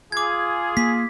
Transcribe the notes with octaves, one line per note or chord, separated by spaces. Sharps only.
F4 G#4 D6 G#6
A#3 B6